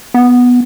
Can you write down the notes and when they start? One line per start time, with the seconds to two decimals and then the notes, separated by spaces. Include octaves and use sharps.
0.14 B3